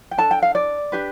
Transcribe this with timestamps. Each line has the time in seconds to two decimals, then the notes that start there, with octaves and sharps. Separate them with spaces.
0.11 G5
0.18 D4 A4 A5
0.31 G5
0.42 F5
0.55 D5
0.92 D4 G4 B4